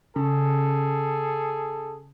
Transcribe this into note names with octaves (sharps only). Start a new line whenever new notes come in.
C#3 G#4 A4